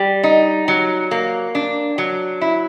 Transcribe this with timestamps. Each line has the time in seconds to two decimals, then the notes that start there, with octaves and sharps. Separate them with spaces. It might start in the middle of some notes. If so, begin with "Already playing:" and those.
Already playing: G3
0.24 D#4
0.68 F#3
1.11 A#3
1.55 D4
1.98 F#3
2.41 E4